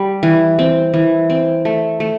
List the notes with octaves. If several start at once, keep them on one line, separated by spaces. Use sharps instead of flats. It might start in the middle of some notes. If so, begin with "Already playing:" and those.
Already playing: G3
E3
C4
E3
C4
A3
A3